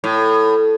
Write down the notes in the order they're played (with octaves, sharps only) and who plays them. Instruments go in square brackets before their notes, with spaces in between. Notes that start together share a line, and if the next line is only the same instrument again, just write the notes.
[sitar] A2